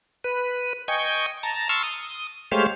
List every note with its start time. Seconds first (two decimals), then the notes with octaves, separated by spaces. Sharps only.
0.24 B4
0.88 D#5 G5 G#5 C#6
1.43 A5 A#5
1.69 A5 C6 C#6 E6 F6
1.83 D#6
2.52 G#3 A3 G4 C5 C#5 F5